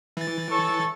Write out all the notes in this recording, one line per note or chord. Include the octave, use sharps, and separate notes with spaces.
E3 A6
A4 C#5 C#6